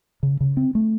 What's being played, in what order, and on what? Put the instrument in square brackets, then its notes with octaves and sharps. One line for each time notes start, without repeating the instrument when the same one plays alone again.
[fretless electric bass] C#3
C#3
C4
A3